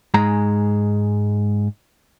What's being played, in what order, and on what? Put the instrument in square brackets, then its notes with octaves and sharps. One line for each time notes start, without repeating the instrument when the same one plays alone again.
[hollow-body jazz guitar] G#2 G#3 A#5